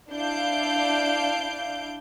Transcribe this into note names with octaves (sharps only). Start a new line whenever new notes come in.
D4 E4 F5 G6 D7